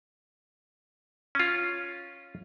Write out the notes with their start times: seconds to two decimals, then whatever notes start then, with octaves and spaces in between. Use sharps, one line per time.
1.35 C#4 F4